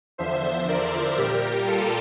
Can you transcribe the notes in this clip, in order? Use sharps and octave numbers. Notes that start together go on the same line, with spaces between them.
E2 D3 F3 C5 E5
A#4 D5
A#2 G3 G4 A#4
F4 A4